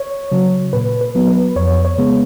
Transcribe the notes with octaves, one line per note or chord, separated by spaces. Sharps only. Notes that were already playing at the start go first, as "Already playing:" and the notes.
Already playing: C#5
C#3 F#3
A#2 B4
B4
F#3 B3
B4
F2 C#5
C#5
C#3 G#3 B3